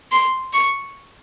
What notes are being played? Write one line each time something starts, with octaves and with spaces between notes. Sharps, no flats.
C6
C#6